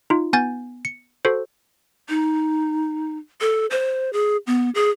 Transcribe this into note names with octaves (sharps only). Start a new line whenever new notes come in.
D#4 F4
B3 G#5 G6 A6
C#7
F#4 A4 C5
D#4
A4
C5
G#4
B3
G#4